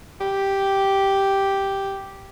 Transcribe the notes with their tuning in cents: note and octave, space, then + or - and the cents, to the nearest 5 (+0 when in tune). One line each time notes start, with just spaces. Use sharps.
G4 -5